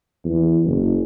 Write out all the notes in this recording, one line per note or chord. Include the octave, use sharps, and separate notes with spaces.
E2
F#1